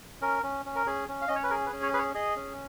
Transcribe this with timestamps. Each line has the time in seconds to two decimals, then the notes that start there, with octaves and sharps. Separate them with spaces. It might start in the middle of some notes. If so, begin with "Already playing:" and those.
0.22 C#4 A#4
0.43 C#4
0.66 C#4
0.76 A#4
0.86 C#4 G#4
1.08 C#4
1.21 F5
1.28 C#4 D#5
1.36 C#5
1.43 B4
1.50 G#4 A#4
1.66 B4
1.73 C#4
1.82 C#5
1.93 G#4 B4
1.98 C#5
2.14 G#4 D#5
2.36 C#4